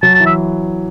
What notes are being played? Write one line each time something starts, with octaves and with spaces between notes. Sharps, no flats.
F#3 A5
A5
E3
E5